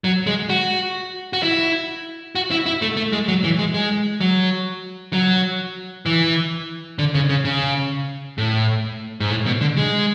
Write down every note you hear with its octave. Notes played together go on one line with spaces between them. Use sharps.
F#3
G#3
F#4
F#4
E4
F#4
E4
E4
A3
A3
G#3
F#3
E3
G#3
G#3
F#3
F#3
E3
D3
C#3
C#3
C#3
A2
G#2
A2
B2
D3
G#3